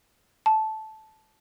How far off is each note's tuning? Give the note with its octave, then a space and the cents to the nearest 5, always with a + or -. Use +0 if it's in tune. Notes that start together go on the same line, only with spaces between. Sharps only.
A5 -10